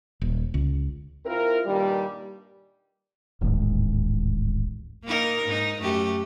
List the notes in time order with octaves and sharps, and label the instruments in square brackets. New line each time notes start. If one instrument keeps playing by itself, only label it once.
[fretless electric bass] D#1
C#2
[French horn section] C4 E4 F4 A#4
G2 A#2 D#3 G3
[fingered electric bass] D1 A1 D#2 G#2
[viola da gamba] A#3 D#4 A#4
G#2 D#4
F#2 A3 G4